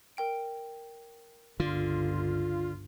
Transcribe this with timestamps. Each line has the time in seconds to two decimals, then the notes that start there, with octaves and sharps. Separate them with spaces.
0.17 A#4 G5 D7
1.60 G1 C#2 D3 F4